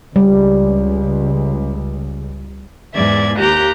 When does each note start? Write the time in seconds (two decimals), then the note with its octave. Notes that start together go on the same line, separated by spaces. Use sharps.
0.16 C#2 G3
2.94 E2 G#2 D5 E5 G#6
3.38 D#2 G4 A#5 F#6 G6